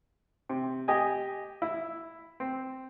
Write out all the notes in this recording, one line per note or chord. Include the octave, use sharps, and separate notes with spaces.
C3
G4 D#5 G#5
E4
C4